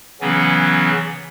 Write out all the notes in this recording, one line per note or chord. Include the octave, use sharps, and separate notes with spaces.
C#3 E3 F#3 B3 C#4